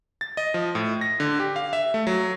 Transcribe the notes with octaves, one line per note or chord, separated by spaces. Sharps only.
A6
D#5
F3
A2
A#6
D3
G4
F5
E5
A3
F#3